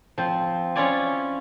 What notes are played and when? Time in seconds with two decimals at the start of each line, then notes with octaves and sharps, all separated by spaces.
0.18 F3 C4
0.75 C#4 E4 F4 C#5 D5 G#5